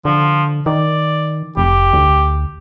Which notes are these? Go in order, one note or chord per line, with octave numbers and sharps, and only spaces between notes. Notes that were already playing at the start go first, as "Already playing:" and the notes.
D3 F3
D#3 D5
F1 G4
D2